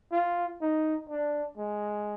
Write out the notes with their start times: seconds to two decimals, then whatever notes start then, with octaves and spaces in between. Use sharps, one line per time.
0.12 F4
0.62 D#4
1.10 D4
1.58 G#3